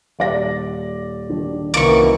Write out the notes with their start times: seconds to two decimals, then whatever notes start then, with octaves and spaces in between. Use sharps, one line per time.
0.19 D#1 D5 A#6
1.30 D#3 D4
1.74 C2 F#2 D#3 E3 A#3 C#6 D6